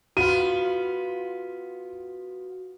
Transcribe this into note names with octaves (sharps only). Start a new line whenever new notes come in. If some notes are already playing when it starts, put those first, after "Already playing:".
B3 F4 F#4 D#7